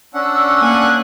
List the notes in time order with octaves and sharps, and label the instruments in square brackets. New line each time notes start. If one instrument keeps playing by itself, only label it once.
[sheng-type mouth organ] C#4 D4 F#5 [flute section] E6
[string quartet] A#3 G#5 F#6